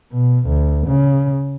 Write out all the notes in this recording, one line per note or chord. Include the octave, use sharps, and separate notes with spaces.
B2
D2
C#3